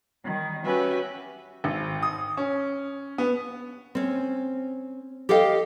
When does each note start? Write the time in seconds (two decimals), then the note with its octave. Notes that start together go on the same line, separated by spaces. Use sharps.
0.24 D#3 G3
0.65 C#4 F#4 G4 B4 E5 G#5
1.64 G#1
2.02 D#6
2.37 C#4
3.18 B3
3.95 C4 C#4
5.29 G4 A4 D#5 F5 G5